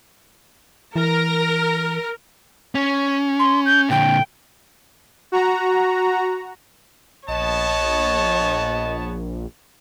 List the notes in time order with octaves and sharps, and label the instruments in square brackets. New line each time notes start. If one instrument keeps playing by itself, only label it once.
[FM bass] E3 [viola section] A#4
[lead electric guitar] C#4
[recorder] C6
G6
[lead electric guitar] A#2 D3 [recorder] G5
[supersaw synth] F#4 A#5
[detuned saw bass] A#1 [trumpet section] B3 A5 [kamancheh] C#5 [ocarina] D#5